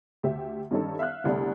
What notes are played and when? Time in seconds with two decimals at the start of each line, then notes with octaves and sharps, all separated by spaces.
0.23 D2 G4 E5
0.71 G2 D#3 C#4 D#4 A4
0.99 E5 F5 F6 F#6
1.24 G1 C2 D3 A3 D5